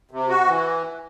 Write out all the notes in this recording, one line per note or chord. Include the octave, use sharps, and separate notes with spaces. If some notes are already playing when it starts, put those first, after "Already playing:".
C3
F#4
E3